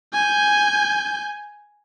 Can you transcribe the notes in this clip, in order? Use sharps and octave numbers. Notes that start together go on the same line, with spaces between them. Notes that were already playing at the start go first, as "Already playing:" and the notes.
G#5 G6